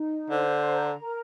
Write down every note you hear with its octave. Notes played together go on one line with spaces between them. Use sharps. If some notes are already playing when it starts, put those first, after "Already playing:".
Already playing: D#4
D3 C5
A#5
A#4